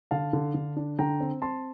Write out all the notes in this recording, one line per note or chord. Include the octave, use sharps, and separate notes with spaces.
D3 F5 A5
D3
D3
D4
D3 G5 A#5
C4
C4 A5 C6